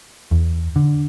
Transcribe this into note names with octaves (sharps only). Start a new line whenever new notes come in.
E2
D3